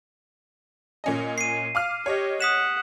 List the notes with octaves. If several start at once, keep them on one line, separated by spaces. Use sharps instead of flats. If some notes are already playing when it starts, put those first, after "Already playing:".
A#2 C#4 D#5
C7 D#7
F5 D6 F6
G4 C#5 D#5
F#5 D#6 B6 E7